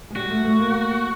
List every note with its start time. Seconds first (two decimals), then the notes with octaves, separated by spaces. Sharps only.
0.10 G#3
0.15 G3 F#4
0.31 A3
0.45 A3
0.60 A#3